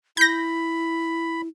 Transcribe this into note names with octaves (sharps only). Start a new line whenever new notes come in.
E4 B5 G6 A#6